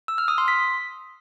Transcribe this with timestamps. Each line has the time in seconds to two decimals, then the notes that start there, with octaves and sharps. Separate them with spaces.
0.08 E6
0.18 F6
0.28 D#6
0.38 C6
0.48 B6